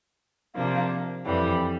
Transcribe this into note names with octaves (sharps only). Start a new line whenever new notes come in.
C3 F3 A#3 D4
F2 E3 G3